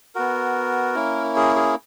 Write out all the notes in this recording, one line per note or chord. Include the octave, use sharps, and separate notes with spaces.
B3 F#4 A#4
A#3 C#4 E4
G#4
G#4